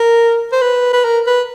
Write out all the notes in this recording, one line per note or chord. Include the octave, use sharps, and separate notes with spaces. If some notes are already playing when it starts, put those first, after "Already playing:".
Already playing: A#4
C5
B4
B4
A#4
B4